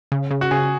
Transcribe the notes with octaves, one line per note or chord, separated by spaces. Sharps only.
C#3
C#3
F#4
C#3 G#4